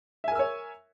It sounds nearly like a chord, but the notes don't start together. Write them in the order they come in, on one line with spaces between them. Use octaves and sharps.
E5 G#5 A#4 E6 C#5